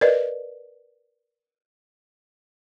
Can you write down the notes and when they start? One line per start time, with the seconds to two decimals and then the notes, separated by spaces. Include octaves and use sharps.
0.01 A#4 B4 D5 D#5